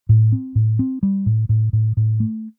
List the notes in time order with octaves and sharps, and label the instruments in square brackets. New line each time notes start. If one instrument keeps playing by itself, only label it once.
[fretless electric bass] A2
C4
A2
C4
G3
A2
A2
A2
A2
A3